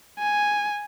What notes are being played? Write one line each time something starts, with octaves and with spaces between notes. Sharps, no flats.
G#5